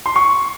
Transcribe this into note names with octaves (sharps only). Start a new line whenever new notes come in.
C6
C#6